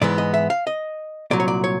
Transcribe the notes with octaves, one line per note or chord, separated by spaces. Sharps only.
G#2 E3 G#3 B3 D5
D#5
E5
F5
D#5
C2 A#2 F#3 D5
C#5
D5
C#5